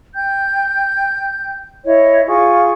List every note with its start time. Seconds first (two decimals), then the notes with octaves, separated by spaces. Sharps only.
0.15 G5 G6
1.86 E4 C#5 D#5
2.27 F4 G#4 C#6